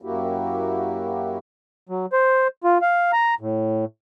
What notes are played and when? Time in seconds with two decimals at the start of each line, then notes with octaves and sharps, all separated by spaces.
0.02 F#2 A#3 E4 F#4 G4
1.89 F#3
2.13 C5
2.64 F4
2.82 F5
3.13 A#5
3.41 A2